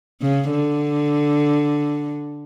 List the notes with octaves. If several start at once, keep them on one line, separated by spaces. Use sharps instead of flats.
C#3
D3